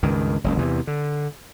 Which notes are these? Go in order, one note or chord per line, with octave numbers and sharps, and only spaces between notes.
C#2 G2 D#3
F#1 C#2 F#2
E2 C3 E3
D3